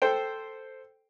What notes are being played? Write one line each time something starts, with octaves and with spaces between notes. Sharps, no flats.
A4 C5 G5